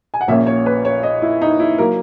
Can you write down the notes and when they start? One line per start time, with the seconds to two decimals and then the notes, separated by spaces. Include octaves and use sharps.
0.14 G#5
0.21 F#5
0.28 A#1 A#2 A#3 C#4 E5
0.47 C#5
0.66 B4
0.85 C#5
1.03 D#5
1.22 E4
1.41 D#4
1.60 E4
1.78 F#3 A#3 A#4